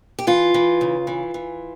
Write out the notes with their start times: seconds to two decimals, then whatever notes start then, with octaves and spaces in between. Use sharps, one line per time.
0.19 G4
0.27 E3 F4
0.54 E3
0.81 C#3
1.07 E3
1.34 E3